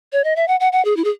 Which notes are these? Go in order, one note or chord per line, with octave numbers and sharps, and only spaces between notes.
C#5
D#5
E5
F#5
F#5
F#5
G#4
E4
G#4